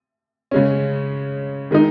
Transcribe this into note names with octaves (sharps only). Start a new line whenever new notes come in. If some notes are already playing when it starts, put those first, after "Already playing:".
C#3 G#3 C#4
D#3 G#3 D#4